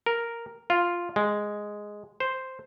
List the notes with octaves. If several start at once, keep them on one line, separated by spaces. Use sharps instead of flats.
A#4
F4
G#3
C5